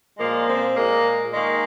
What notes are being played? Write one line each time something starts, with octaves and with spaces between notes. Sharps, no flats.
A#2 F3 G#3 A#3
C4
A#2 G#3 A#3
D#3 G#3 A#3